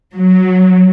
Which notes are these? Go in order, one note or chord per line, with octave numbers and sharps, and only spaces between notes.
F#3